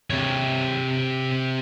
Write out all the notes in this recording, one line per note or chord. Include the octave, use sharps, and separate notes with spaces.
C3 C#5